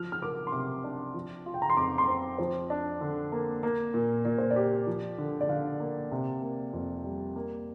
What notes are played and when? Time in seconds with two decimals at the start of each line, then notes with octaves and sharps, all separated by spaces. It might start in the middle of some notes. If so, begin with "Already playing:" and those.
Already playing: F3 F6
0.12 F6
0.22 A#4 D6
0.47 C6
0.52 C3 D6
0.84 D4
1.14 F3
1.46 F4
1.54 G5
1.62 A#5
1.70 C6
1.77 F2 D6
1.98 C6
2.08 C4
2.38 F3 C5
2.70 D4
3.01 D3
3.32 A#3
3.63 A#3
3.94 A#2
4.25 A#2 D5
4.38 C5
4.51 D5
4.56 G4
4.87 F3
5.18 D3
5.41 D5
5.49 D3 F5
5.80 A#3
6.11 C3
6.42 A#3
6.73 F2
7.04 G3
7.36 A#3